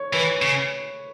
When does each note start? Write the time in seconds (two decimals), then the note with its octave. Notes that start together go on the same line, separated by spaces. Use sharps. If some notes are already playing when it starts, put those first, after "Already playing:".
Already playing: C#5
0.13 E3 B4
0.42 C#3